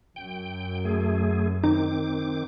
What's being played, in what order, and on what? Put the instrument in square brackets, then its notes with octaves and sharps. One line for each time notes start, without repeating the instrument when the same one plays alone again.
[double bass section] F#2 [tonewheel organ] G5
[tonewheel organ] A3 G#4
[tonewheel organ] D#3 C4 D6 [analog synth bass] D#4